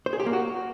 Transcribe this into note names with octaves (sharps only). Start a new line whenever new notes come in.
C5
G#4
G4
A#3
F#4